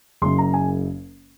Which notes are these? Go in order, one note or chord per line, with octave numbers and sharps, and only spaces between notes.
F#1 F#2 C#3 C6
A#5
G#5